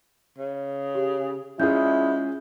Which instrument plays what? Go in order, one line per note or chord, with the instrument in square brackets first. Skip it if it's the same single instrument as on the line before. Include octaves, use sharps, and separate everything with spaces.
[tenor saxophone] C#3
[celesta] G4
[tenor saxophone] G#3 [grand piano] C#4 F4 G#4 [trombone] E4 [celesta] G6